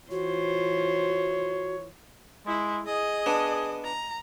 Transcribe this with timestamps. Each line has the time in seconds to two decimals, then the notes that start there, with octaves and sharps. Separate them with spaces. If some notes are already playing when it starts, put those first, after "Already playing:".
0.11 E3 F4 F#4 C5 C#5
2.46 G#3 E4
2.86 G#4 D#5
3.26 B3 D4
3.84 A#5